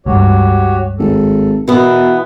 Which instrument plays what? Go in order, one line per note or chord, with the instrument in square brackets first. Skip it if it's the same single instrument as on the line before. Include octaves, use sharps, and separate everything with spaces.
[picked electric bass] C#2 G2 [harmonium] F#4 G4 C#5
[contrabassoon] G#1 [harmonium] A4
[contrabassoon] B2 [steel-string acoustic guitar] E3 B3 [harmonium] A#4